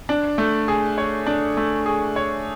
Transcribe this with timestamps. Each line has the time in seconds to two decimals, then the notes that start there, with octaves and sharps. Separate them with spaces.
0.09 D4
0.38 A3
0.68 G#4
0.98 C#5
1.27 D4
1.57 A3
1.86 G#4
2.16 C#5